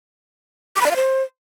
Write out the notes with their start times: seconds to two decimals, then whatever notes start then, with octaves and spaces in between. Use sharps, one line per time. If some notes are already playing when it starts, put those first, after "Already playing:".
0.76 D6
0.81 B5
0.86 D5
0.91 F5
0.96 C5